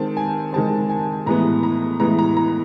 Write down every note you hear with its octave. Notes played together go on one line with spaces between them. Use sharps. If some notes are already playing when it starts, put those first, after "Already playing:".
Already playing: D#3 G#3 C4 A5
G#5
D#3 G#3 C4 A5
G#5
A2 E3 G#3 B3 A#5
A#5
A2 E3 G#3 B3 A#5
A#5
A#5